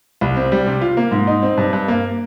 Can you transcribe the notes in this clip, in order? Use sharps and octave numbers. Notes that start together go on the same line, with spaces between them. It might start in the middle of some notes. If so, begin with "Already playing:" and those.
C2
C4
G3
C3
F4
A#3
G#2
D#4
C4
G2
G2
A#3